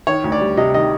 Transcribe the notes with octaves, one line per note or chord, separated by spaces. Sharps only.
D#3 C#5
D2
D5
G3
C3 D#5
D#3 D#5